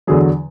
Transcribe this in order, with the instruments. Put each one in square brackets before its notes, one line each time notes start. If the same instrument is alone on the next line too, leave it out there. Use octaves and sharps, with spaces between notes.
[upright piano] E2 D3 F#3 G#4